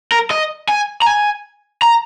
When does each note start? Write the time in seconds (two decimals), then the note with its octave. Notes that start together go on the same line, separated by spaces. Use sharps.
0.12 A#4
0.31 D#5
0.69 G#5
1.02 A#5
1.06 G#5
1.82 A#5